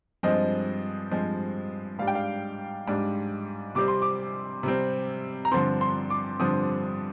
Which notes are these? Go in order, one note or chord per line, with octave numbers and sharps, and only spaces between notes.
G2 F3 G#3 C4 D#5
G2 F3 G#3 C4
G#2 G3 D4 F5
G5
F5
G#2 G3 D4
C3 G3 C4 D6
C6
D6
C3 G3 C4
A#5
G2 D3 F3 C4 C6
C6
D6
G2 D3 F3 C4 D#6